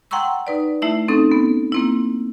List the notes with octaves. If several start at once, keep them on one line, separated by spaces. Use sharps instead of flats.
F#5 G5 A#5 C6 C#6 E6
D#4 B4 D5
A3 E4 E5
C4 C#4 D#4 A4
B3
A#3 C4 E4